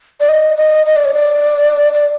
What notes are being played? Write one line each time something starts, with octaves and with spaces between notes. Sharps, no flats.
D5
D#5
D#5
D#5
D5
C#5
D5
D5